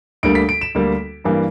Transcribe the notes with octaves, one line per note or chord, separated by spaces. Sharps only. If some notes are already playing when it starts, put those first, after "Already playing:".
D2 D3 G3 A#3 D7
B6
D7
E7
D2 D3 G3 A#3
G2 E3 G3 A#3